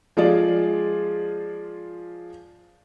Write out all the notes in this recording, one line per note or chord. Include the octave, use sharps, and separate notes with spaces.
F3 G#3 F4 G#4 D5